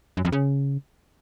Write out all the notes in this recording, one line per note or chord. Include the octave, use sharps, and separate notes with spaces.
F#2
F2
C#3